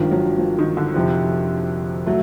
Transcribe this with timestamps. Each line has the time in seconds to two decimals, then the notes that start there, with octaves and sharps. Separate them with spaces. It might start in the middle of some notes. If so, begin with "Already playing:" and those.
Already playing: G#1 G2 D#3 F3
0.11 F#3
0.39 F3
0.58 D#3
0.77 D3
0.94 F2 C3 F3
2.07 F#3 A3